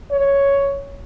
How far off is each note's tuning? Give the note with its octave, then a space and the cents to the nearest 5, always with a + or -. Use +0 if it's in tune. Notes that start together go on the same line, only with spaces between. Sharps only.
C#5 +5